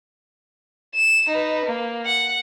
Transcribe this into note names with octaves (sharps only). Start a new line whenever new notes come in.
E7
D#4 B4
A#3
F#5